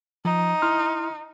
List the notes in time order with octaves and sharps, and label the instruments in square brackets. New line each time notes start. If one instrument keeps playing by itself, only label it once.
[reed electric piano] F3 [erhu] D#4
[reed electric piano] E4 C6 F6